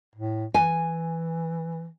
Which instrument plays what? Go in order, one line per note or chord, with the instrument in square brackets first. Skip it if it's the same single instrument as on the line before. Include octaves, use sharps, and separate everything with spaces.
[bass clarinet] A2
[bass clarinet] E3 [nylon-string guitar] G#5